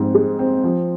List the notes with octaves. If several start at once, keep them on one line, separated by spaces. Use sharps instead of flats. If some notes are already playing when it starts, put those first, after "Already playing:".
Already playing: G#2 F3 C4
G#3
C4
F3